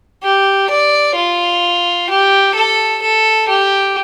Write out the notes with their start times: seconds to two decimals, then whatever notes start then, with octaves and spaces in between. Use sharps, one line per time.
0.23 G4
0.70 D5
1.15 F4
2.09 G4
2.55 A4
3.02 A4
3.48 G4